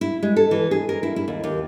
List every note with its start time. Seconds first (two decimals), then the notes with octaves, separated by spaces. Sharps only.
0.01 E4
0.23 G#3
0.36 A4
0.51 E3
0.71 G#4
0.89 A#4
1.03 E4
1.16 E4
1.28 D#2
1.44 D#2